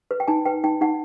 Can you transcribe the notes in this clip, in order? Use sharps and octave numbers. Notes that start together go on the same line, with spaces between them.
B4
G5
D#4 G#5
B4 G5
D#4 G5
D#4 F#5